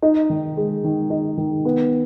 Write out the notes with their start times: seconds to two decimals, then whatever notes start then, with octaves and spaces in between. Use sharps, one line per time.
0.02 D#4
0.30 D#3
0.57 G#3
0.84 D#3
1.10 D#4
1.38 D#3
1.65 B3